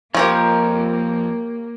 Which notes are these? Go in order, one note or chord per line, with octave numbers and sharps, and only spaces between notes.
F2 F3 A#3 G4 A#4 C#5